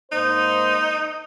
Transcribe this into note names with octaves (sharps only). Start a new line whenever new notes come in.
G#2 A#3 D#4 C5